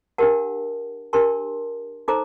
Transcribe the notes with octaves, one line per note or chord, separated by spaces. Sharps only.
D4 G4 A#4 F#5 A5
D4 G4 A#4 A5 C6
D#4 A4 C5 A#5 D6